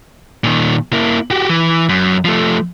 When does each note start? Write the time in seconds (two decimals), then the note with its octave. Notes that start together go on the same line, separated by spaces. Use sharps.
0.44 A#2 D#3
0.93 A#3 E4
1.30 F#4 G4
1.49 E3
1.89 F#2
2.25 F3 A3